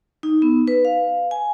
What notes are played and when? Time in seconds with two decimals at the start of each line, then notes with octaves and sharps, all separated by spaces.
0.23 D#4
0.42 B3
0.67 B4
0.85 F5
1.31 G#5